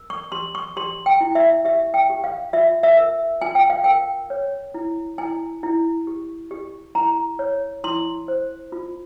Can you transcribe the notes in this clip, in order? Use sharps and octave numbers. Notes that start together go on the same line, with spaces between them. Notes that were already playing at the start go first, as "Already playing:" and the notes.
Already playing: A#4
C#6
G4 C6
C#6
G4 C6
G5
E4
E5
G4 E5
G5
G4
F5
F4 E5
E5
A#4
F4 G#5
G5
F5
A#4 G5
C#5
E4
E4 G#5
E4
G4
G4
E4 A#5
C#5
E4 C6
C5
F4